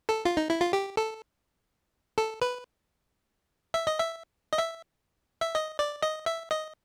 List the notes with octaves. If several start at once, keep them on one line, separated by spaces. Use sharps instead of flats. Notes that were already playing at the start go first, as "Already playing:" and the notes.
A4
F4
D#4
E4
F4
G4
A4
A4
B4
E5
D#5
E5
D#5
E5
E5
D#5
D5
D#5
E5
D#5